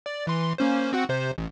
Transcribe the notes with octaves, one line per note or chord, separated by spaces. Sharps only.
D5
E3 C6
A#3 C#4 C5
C4 F#4 F#5
C3 C5
A1